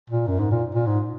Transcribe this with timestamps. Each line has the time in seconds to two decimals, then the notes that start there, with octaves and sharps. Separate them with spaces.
0.10 A#2
0.28 F#2
0.39 G#2
0.51 A#2
0.74 A#2
0.87 G#2